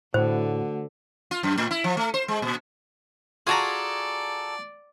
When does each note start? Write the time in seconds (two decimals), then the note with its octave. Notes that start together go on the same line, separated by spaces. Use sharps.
0.14 A2 D3 A3 F#4 C5 F#5
1.31 F4
1.43 F#2
1.58 A2
1.71 E4
1.84 F3
1.97 A3
2.14 C5
2.28 G#3
2.42 A#2
3.47 F4 F#4 G#4 A4 D5 A#5